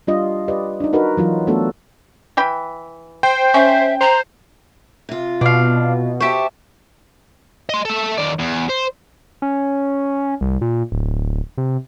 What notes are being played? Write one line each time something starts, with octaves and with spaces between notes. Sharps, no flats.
G3 D4 F4 D#5
G4 B4 D5 D#5
D4 D#4
D#4 F#4 A#4 B4
E3 F#3 F4
A3 B3 D4 F#4 A4
E3 G5 B5
C5 G5
C#4 E5
C5 A#5
C3 F4
B2 D4 F5
G4 C5 E5 A5 C#6
D#5 C6
A4 E5
D#3 D5
E2
C5
C#4
C2
A#2
D1
C3